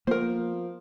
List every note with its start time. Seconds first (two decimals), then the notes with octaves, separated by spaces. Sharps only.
0.07 F3 A#3 B3 A#4 C5